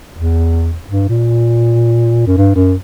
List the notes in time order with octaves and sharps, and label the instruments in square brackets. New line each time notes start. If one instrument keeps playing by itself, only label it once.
[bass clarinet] E2
G2
A#2
F#2
G2
F#2